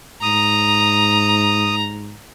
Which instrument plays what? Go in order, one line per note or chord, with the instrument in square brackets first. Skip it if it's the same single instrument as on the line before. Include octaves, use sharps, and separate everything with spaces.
[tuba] G#2 [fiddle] A#5 [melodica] D#6